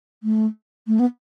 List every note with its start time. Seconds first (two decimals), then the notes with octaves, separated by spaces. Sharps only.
0.23 A3
0.87 A3
0.99 B3